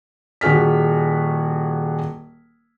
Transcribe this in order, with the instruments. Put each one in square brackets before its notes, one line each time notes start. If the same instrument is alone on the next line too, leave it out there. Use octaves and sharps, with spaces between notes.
[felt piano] D#1 F#4 G#4 F6 B6